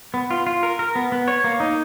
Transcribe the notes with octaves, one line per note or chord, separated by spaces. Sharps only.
B3
F4
F4
A#4
A#4
B3
B3
C#5
A#3
D#4